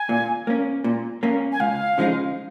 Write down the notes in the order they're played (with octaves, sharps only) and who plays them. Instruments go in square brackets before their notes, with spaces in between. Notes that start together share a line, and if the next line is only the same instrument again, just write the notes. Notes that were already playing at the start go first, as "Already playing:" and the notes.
Already playing: [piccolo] G#5
[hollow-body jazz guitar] A#2
A#3 C#4
A#2
A#3 C#4
[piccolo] G#5
[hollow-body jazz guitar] C#2 [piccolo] F5
[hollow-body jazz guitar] C#3 F3 G#3 D#4